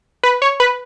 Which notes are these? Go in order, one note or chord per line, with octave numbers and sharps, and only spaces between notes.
B4
C#5
B4